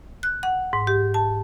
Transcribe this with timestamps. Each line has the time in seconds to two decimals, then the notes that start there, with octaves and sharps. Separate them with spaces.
0.23 F#6
0.43 F#5
0.73 G#2
0.87 G4
1.14 A5